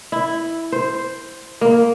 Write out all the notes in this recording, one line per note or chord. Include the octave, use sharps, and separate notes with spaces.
E4
C5
A#3